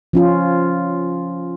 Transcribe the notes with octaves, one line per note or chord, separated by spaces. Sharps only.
F3 C#4 F4